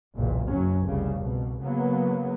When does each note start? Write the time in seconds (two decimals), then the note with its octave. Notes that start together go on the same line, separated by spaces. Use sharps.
0.17 F#1 B1 E2 A#2
0.50 F#1 F#2 F#3 C#4
0.84 F1 C2 C#3 G3
1.19 C2 B2
1.63 C#3 F#3 A#3 B3